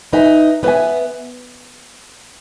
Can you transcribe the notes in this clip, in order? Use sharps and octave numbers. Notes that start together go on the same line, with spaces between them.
D#4 B4 E5 G#5
B3 B4 E5 G#5